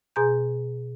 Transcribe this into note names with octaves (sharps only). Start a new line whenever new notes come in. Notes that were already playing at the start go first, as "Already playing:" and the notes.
B2 G#4 G#5 A#5 C6 G6